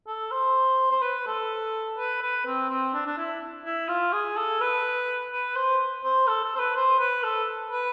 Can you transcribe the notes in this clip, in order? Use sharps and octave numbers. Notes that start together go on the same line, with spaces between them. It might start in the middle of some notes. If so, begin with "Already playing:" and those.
A4
C5
C5
B4
A4
B4
B4
C4
C4
D4
D4
E4
E4
F4
G#4
A4
B4
B4
C5
C5
A4
A4
C5
B4
C5
B4
A4
B4